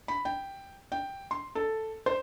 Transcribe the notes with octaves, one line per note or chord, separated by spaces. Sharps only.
B5
G5
G5
C6
A4
C5